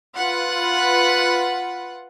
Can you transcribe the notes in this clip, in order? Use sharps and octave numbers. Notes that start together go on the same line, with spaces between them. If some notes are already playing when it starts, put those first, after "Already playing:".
F4 B4 F#5